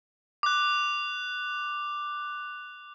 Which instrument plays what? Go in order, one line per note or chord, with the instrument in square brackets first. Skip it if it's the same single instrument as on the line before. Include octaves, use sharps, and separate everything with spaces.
[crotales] D6 F#6